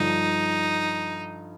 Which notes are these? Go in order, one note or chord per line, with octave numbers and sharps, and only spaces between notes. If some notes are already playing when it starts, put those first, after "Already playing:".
Already playing: G2 D3 F3 D#4